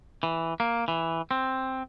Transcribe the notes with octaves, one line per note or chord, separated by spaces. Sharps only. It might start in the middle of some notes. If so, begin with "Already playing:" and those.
E3
A#3
E3
C4